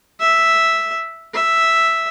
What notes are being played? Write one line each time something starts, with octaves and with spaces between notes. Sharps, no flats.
E5
E5